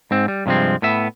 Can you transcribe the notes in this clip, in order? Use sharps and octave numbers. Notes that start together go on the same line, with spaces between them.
G#2 C4
G3
G2 C3 F3 G#3 C4
A2 B3 E5